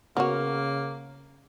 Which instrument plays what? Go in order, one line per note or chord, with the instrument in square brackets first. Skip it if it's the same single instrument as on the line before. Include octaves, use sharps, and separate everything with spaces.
[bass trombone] C#3 [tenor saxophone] A#3 [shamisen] B3 F#4 [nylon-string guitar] A#4 C#5